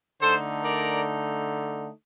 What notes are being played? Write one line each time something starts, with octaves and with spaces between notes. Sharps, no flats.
D3 A3 D#4 A4 C5
A#4 D5